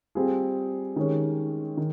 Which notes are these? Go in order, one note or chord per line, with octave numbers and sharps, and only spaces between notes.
G3 C4 F4 G#4
D#3 G#3 C#4 G4 C#5
D#3